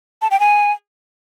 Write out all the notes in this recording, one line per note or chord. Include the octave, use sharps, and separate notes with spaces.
A5
G5
G#5